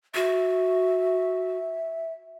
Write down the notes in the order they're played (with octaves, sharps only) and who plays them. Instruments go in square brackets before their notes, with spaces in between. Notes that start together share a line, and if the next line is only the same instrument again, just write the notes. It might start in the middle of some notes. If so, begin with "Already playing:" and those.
[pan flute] F#4 [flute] E5